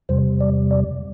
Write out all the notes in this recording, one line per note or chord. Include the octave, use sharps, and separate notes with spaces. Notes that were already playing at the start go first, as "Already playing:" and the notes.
E2 C3 G3 C5
D5
D5